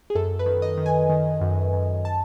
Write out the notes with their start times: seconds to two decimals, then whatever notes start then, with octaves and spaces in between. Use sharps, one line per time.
0.10 G#4
0.15 F#2 A4
0.39 B4
0.46 D#3
0.62 D#5
0.78 D#3
0.86 G#5
1.09 D#3
1.41 F#2
1.73 F#2
2.05 A5